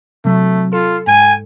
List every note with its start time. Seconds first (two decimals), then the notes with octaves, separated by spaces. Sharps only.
0.25 C3 F#3 A3
0.73 F4 A4
1.07 G#2 G#5